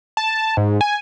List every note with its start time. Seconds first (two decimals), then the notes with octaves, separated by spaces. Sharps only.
0.17 A5
0.57 G#2
0.81 G#5